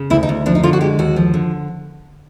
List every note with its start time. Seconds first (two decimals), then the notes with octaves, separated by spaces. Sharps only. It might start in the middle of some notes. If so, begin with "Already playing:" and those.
Already playing: C#3
0.10 D2 E4
0.23 D#4
0.29 D2
0.46 F3 D4
0.55 D#4
0.63 D3 F4
0.73 F#4
0.81 G#3 G4
0.99 D#2 F#4
1.16 F3
1.34 D3